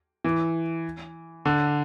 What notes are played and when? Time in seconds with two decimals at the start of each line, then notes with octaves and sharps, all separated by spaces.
0.24 E3
1.45 D3